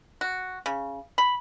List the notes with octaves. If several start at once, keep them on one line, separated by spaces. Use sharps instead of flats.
F#4
C#3
B5